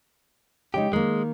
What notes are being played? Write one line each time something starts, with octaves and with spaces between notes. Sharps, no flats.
C#3 G#3 D#4 G4
D#3 G#3 A#3